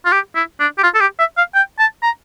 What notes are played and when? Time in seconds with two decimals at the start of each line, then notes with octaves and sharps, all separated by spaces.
0.05 F4
0.12 G4
0.35 E4
0.60 D4
0.78 G4
0.83 F4
0.95 A4
1.01 G4
1.19 E5
1.37 F5
1.54 G5
1.79 A5
2.03 A#5